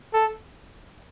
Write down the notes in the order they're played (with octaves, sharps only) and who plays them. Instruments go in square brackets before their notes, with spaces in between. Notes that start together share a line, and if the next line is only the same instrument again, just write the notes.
[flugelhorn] A4